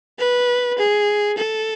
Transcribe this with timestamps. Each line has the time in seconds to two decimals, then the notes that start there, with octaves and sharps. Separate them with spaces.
0.18 B4
0.78 G#4
1.37 A4